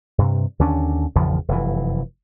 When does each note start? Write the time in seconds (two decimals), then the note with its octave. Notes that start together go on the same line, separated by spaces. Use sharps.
0.18 G2 C3
0.59 D#2 D3 C#4 D4
1.16 G#1 E2 C#3 F3
1.48 F1 F#2 B2 E3